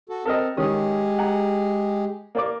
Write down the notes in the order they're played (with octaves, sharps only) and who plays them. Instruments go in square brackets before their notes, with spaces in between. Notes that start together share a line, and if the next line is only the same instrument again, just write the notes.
[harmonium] F#4 A4
[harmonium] C4 [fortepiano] A4 A#4 D#5
[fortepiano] D#3 C#4 D#6 [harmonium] G#3 G4 G#4
[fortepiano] F#5 G#5 A#5
A#3 D5 D6